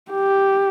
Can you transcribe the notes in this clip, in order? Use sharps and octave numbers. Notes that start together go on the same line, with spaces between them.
G4